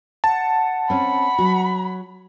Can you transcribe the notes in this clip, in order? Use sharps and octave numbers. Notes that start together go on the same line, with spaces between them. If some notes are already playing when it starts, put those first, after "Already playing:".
F#5 A5
C4 C#4 B5
F#3 F#4